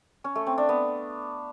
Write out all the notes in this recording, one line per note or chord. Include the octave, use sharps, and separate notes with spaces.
C#4
A3
C4
D4
B3